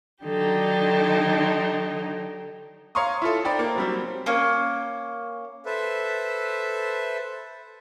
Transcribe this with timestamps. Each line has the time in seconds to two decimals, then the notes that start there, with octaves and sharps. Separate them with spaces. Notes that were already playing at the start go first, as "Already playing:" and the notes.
0.24 D3 D#3 F#3 D#4 G4 A4
2.95 C#5 F5 A#5 C6 C#6 D#6
3.22 E4 F4 A4
3.45 D#4 C5 D5 G5 B5
3.59 A#3
3.76 F#3 G3 C4
4.26 A#3 C#4
5.66 A4 B4 C5 E5